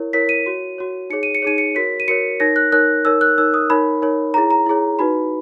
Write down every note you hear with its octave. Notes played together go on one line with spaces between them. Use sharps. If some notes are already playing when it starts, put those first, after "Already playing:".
Already playing: E4 A#4 C#5
E4 A#4 C#5 B6
D#7
F#4 C#5
F#4 C#5
D#4 G#4 C#5 C#7
D#7
C#7
D#4 G#4 C#5 D#7
C#7
F#4 A#4 C#5 B6
D#7
F#4 A#4 C#5 C#7
D#4 A#4 C#5 A#6
F#6
D#4 A#4 C#5 F#6
D#4 A#4 C#5 E6
F#6
D#4 A#4 C#5 E6
D#6
D#4 A#4 C#5 B5
D#4 A#4 C#5
E4 G#4 C#5 A#5
A#5
E4 G#4 C#5
D#4 F#4 B4 B5